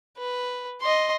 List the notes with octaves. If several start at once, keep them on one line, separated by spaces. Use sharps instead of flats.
B4
D#5 C6